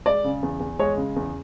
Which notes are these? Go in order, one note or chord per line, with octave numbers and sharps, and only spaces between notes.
G#3 D5
C#3
E2
E2
G#3 C#5
C#3
E2